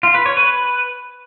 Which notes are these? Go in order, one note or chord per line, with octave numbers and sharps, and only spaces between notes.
F4
B4
C#5
B4